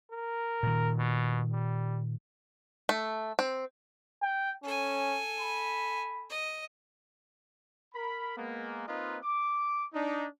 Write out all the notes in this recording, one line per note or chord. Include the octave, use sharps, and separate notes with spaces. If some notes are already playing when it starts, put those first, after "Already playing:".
A#4
A#2 D#3
B2
G3
A3
C4
G5
C#4 A4 G#5
B5
D#5
A#4 B5
G#3 A#3 B3
A#3 C4 D#4 F4 B4 D#5
D6
D4 D#4